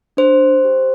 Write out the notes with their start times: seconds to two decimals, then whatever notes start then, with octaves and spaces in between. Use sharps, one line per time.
0.17 D4 C5
0.64 G4